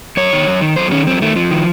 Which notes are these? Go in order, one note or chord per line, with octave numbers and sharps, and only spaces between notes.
F#2 C#5
D#3
F#2
D#3
F#2 C5
D#3 C#4
F#2 C4
D#3 A3
F2 F3
D#3